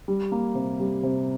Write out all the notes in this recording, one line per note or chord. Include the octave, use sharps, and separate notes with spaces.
G3
A#3
C3
G3
C3